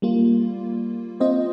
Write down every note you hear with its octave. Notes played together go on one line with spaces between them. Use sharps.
G3 A#3 F4
C4 F4 C5 D#5